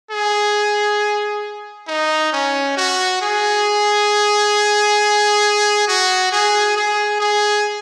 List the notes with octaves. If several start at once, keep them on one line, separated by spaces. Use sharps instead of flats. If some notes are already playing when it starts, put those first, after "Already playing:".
G#4
D#4
C#4
F#4
G#4
F#4
G#4
G#4
G#4